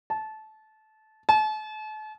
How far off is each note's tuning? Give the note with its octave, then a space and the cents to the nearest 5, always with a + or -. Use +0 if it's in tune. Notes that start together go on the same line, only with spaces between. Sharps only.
A5 -20
A5 -40